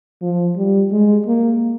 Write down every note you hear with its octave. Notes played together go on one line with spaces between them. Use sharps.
F3
G3
G#3
A#3